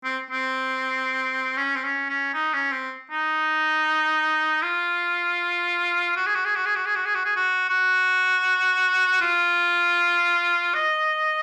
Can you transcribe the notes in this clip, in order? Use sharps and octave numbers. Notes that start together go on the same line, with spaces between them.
C4
C4
C#4
C4
C#4
C#4
D#4
C#4
C4
D#4
F4
F#4
G#4
F#4
G#4
F#4
G#4
F#4
G#4
F#4
G#4
F#4
G#4
F#4
F#4
F4
D#5